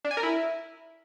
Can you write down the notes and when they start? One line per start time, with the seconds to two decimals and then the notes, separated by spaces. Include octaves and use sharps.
0.05 D4
0.11 G#5
0.17 A#4
0.23 E4